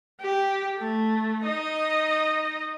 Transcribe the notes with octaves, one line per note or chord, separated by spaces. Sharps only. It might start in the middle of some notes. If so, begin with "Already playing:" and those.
G4
A3
D#4 D#5